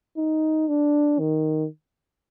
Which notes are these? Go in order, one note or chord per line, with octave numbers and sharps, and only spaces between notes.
D#4
D4
D#3